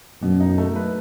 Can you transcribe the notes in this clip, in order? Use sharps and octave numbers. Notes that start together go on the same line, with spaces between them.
F#2 B2
D#4
A3
B4